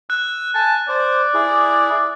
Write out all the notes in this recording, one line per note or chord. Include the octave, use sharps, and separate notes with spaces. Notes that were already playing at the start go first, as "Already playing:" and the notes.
E6 F#6
G#5 A5
C5 D5
E4 G#4